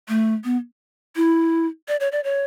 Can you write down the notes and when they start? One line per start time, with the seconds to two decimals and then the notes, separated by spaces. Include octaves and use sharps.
0.09 A3
0.44 B3
1.16 E4
1.88 D5
2.00 C#5
2.12 D5
2.24 C#5